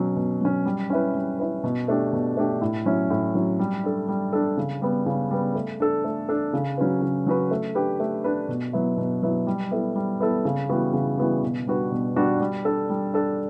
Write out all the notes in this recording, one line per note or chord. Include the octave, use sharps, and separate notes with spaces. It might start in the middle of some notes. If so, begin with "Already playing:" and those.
Already playing: B2 F#3 C#4
B2
F#3 C#4
G3
C#4 E4 B4
G3
C#4 E4 B4
B2
A3 D4 G4
B2
A3 D4 G4
A2
F#3 C#4 E4
A2
F#3 C#4 E4
G3
D4 A4
G3
D4 A4
C#3
G3 B3
C#3
G3 B3
A3
D4 A4
A3
D4 A4
C#3
F#3 C#4 F#4 B4
C#3
F#3 C#4 F#4 B4
A3
D4 G4 B4
A3
D4 G4 B4
B2
F#3 B3 E4
B2
F#3 B3 E4
G3
B3 E4 A4
G3
B3 E4 A4
C#3
E3 G3 B3 F#4
C#3
E3 G3 B3 F#4
B2
G3 D4 F#4 B4
B2
G3 D4 F#4 B4
G3
D4 A4
G3
D4 A4